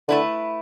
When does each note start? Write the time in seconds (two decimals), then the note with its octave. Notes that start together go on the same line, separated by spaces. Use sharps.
0.08 D3 A3 E4 B4